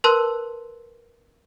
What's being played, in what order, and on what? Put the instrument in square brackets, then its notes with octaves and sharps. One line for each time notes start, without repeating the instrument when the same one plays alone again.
[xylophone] A#4 B4 A5 C6 E6 F#6